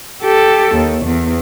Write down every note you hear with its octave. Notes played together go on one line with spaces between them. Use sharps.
G4 A4
D#2
E2